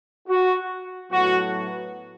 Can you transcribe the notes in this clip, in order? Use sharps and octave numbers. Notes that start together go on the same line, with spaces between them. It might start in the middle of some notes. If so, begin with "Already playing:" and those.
F#4
A2 F#3 B3 F#4